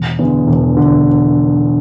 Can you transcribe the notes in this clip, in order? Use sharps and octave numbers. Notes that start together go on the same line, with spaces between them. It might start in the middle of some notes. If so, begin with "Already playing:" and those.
Already playing: E1
E2 D3
E1
D3